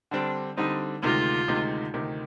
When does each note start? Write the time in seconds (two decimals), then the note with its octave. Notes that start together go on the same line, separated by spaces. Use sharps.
0.11 D3 G3 C4 D4
0.57 D3 G3 C4 D#4
1.03 D2 C3 D#3 G#3 D#4 F4
1.48 D2 C3 D#3 G#3 D#4
1.94 D2 C3 D#3